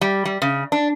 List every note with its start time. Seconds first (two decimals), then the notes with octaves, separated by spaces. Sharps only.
0.01 G3
0.25 G3
0.42 C#3
0.72 D4